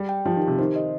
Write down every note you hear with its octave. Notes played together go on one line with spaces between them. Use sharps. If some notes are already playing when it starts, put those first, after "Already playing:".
Already playing: G3
G5
F3 G4
D#3
G4
C3
D#3 C5
D#5